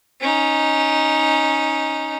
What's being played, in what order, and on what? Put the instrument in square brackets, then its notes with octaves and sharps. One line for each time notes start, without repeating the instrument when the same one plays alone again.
[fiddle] C#4 D#4